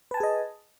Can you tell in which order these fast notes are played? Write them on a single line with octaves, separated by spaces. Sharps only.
B4 A5 G#5 G#4 D#5